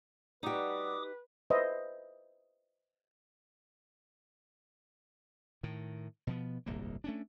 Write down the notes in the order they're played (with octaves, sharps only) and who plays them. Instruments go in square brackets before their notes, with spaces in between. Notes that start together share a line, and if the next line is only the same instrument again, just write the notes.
[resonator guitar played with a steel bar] G3 F#4 [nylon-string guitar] D#4 G4 [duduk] B4 [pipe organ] D6 D#6
[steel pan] B4 C5 D#5 E5
[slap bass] A2 D#3
B2 F3 B3
D1 G1 C2 A#3
A3 C#4 D4